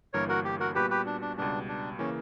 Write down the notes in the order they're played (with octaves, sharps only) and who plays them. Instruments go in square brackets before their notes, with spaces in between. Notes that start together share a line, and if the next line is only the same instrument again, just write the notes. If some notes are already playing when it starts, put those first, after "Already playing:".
[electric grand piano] G1 G2 E3 A#3 [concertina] A#4 C#5
[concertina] F#4 A#4
G4
F#4 A#4
[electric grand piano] A#2 G3 B3 F#4 [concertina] G4 B4
[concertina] G4 B4
D4
D4
[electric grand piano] C#2 B2 G3 [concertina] D4
[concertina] D4
[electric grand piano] C#3 E3 A#3 [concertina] C#4